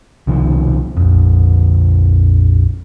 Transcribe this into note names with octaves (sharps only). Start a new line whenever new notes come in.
C2 B2 D#3 F3
A#1 F2